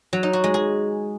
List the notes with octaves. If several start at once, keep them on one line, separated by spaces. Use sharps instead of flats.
F#3
D#4
F#4
G#3
G#4